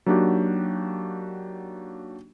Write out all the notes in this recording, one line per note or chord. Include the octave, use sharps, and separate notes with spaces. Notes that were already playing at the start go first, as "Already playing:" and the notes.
F#3 A#3 D4 D#4 F#4 G4